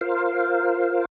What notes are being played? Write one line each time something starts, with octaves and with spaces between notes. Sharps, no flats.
F4 A#4 C5 F5